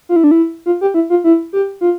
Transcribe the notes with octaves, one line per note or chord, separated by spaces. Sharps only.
F4
E4
D4
E4
F4
G4
E4
F4
E4
G4
F4